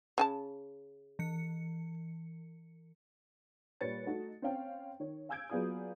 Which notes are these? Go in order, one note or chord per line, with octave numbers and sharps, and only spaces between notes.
C#3 G#5 A5
E3 C#7
A#2 G3 B4 C#5 A6 C#7
A3 D#4 F#4
C4 C#4 C#5 F5 G5
D#3 C#5
F5 G#5 E6 G6 G#6 D7
F#3 B3 F4 G#4 D5 D#6